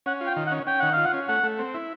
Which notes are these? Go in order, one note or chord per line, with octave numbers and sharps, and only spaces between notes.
C#4 F#5
F4
G5
D#3
F#5
C#4
C#4 G5
D#3 F#5
F4 F5
F#5
C#4
A3 F#5
A3
C4
E4